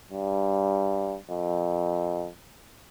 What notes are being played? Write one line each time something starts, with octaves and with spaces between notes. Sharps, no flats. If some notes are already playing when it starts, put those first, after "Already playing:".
G2
F2